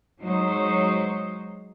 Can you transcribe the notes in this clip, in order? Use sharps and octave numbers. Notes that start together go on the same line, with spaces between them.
F#3 G#3 D#4 C5